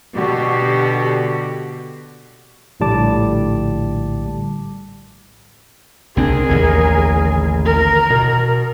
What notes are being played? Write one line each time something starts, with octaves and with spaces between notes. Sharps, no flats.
B2 D3 F#4 G4
A#1 A2 D3 G3 A5 D6
C2 C4 D4 G#4 A#4
A1 D#2 D3
A#4
B2